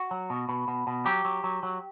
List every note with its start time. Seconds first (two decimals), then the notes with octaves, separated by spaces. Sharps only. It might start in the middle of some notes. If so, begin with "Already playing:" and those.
Already playing: F#4
0.11 F#3
0.30 B2
0.49 B2
0.68 B2
0.87 B2
1.06 F#3 G4
1.25 F#3
1.44 F#3
1.63 F#3